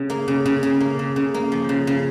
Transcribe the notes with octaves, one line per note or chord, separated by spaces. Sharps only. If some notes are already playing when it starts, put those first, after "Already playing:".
Already playing: C#3
A#3
C#3
C#3
C#3
A#3
C#3
C#3
A#3
F3
C#3
C#3